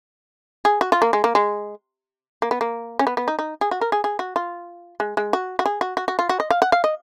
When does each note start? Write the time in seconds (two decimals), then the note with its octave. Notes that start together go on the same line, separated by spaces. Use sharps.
0.65 G#4
0.81 F#4
0.92 F4
1.02 A#3
1.13 G#3
1.24 A#3
1.35 G#3
2.42 A#3
2.51 B3
2.61 A#3
2.99 C#4
3.07 B3
3.17 B3
3.28 D#4
3.39 D#4
3.61 G#4
3.71 F#4
3.81 A#4
3.92 G#4
4.04 G#4
4.19 F#4
4.36 F4
5.00 G#3
5.17 G#3
5.33 F#4
5.59 F#4
5.66 G#4
5.81 F#4
5.97 F#4
6.08 F#4
6.19 F4
6.29 F#4
6.40 D#5
6.50 F5
6.62 F#5
6.72 F5
6.84 D#5